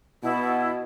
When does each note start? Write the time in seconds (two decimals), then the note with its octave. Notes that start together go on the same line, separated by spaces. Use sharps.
0.23 B2 E4